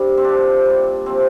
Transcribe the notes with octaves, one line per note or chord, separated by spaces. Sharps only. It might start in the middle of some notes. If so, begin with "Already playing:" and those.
Already playing: G2 C3 G3
C4
C3 F3 D4
A#2 G3
C3 F3 C4